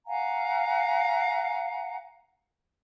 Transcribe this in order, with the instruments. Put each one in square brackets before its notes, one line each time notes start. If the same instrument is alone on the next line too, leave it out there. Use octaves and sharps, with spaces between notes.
[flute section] F5 F#5 G#5 A#5